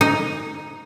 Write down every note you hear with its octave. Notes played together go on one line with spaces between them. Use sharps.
D#4